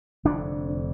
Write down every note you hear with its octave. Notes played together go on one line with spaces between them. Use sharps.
F1 F2 D3 D4